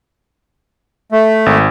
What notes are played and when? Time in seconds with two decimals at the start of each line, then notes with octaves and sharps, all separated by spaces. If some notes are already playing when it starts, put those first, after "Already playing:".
1.12 A3
1.46 G#1